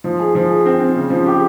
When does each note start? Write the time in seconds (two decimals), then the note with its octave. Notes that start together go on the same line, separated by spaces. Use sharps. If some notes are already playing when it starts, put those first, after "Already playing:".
0.04 F3
0.19 G#4
0.35 F3
0.50 G#4
0.66 C4
0.80 C4
0.95 C#3
1.10 F3
1.26 G4